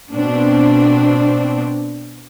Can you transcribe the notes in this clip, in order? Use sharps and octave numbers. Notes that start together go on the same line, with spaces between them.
B2 C4 D4